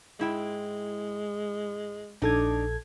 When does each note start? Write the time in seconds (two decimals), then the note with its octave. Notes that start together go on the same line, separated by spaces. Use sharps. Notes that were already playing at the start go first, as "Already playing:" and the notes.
0.20 G#2 G#3 E4 G5
2.22 A#1 D4 D#4 A4 G#6